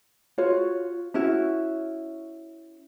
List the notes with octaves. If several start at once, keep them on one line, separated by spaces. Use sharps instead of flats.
F4 F#4 C#5
C#4 E4 F#4